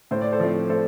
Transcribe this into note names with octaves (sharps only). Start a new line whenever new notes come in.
A2 C5
D5
A4 C5
F3 A3 C4
A2 A4 C5